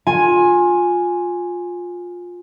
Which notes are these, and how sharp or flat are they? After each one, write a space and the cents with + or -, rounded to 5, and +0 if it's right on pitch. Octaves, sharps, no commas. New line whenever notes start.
F4 +20 G#5 +0